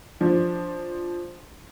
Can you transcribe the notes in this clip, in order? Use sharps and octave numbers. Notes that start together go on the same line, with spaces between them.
F3 D4